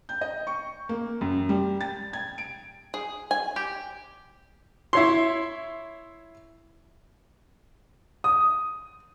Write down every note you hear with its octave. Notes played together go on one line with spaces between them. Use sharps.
G6
D#5
C#6
A#3
F#2
G3
A6
G#6
D7
G#4
G#5
G4
E4 C#5 C6
D#6